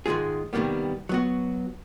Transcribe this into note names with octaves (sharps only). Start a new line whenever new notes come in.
G#2 D#3 G#3 F4 G#4
C3 D#3 E3 G3 A#3 B3
F#3 B3 F#4